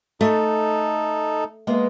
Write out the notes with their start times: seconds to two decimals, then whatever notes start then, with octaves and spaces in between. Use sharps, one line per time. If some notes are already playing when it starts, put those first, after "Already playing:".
0.21 A3 D#4 A4
1.67 G#3 A#3 B3